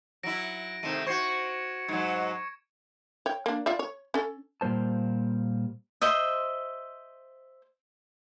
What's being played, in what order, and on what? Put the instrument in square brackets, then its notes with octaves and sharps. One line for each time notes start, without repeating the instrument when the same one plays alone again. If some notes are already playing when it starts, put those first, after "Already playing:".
[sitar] F#3 E4 [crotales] A#6 D7
[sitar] C3 D#3 A3 [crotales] D#7 E7
[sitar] F#4 C5 [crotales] C#6 G#6 C#7
[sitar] G#2 F#3 [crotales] G#6 C#7
[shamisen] C#5 G5
A#3 D4
F4 D5 E5
C#5
C#4 A4
[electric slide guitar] A#2 G3 A#3 C5 A5
[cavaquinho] C5 D#5 E5